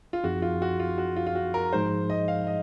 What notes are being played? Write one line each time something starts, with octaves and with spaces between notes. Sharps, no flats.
F4
F#2 F3 C4 D#4 F#4 G#4
F4
F#4
F4
F#4
F4
F4
F#4
A#4
G#2 F3 G#3 D#4 G#4 C5
D#5
F5
D#5